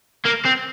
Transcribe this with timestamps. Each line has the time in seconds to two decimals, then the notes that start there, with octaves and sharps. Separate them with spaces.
0.25 A#3
0.45 C4